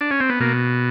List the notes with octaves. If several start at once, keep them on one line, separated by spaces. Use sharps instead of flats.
D4
C#4
C4
B3
B2 A#3